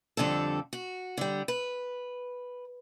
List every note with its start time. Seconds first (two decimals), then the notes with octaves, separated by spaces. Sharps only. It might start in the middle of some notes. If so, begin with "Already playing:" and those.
0.17 F2 D3 G3 A4
0.73 F#4
1.17 D3 G3
1.48 B4